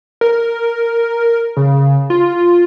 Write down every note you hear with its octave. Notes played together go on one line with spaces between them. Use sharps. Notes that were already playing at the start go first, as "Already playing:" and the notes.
A#4
C#3
F4